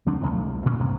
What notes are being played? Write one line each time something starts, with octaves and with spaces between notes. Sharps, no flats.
C#2 F#3 C4 D4
A1 B2 D3 E3
B1 A3
C2
D2 A#2 A#3 C#4
C2 G2 C3 A#3